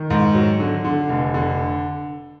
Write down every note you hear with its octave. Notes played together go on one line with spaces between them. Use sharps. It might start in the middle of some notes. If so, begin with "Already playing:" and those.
Already playing: D#3
G#2
F#3
D3
D3
F1
D3